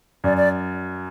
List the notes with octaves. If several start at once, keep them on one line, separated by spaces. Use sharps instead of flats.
F#2 D5
D5